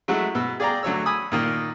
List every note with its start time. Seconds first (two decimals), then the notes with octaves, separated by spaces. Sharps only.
0.08 F#3 G#3 A3 E4 F#4
0.35 B2 E6
0.60 G#4 D5 F5 G5 A#5
0.83 D2 F#3 C#5 E6
1.06 G#5 B5 D#6 E6
1.32 A#2 D#3 A#3